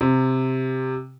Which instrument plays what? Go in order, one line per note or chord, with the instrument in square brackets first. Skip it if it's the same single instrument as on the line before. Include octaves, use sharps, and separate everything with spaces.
[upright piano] C3